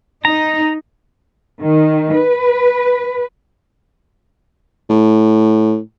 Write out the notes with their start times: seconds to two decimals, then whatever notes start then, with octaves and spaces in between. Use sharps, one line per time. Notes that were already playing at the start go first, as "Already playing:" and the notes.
0.25 D#4 A#5
1.59 D#3
2.14 B4
4.89 A2